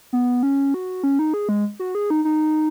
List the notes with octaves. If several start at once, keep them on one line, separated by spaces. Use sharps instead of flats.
B3
C#4
F#4
C#4
D#4
G#4
G#3
F#4
G#4
D#4
D#4